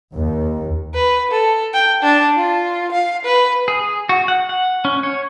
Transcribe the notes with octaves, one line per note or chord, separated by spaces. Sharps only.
D#2
B4
A4
G5
D4
F4
F5
B4
G#4
F#4
F#5
F#5
C#4
C#5